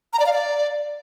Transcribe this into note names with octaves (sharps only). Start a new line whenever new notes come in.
A#5
D5
F5
D5